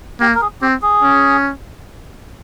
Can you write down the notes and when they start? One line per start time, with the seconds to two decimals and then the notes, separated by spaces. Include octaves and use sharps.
0.21 A#3 G4
0.35 A#4
0.41 G#4
0.61 C4 G4
0.82 G#4
1.03 C#4